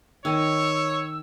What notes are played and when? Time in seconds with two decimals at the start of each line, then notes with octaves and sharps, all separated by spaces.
0.25 D#3 C#5 G#5 E6